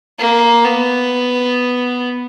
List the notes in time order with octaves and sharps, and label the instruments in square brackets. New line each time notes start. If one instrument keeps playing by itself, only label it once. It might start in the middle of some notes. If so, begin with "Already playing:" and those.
[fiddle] A#3
B3